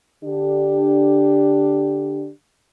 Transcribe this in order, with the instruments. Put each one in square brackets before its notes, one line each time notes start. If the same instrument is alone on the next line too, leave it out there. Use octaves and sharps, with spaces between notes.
[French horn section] D3 D4 G4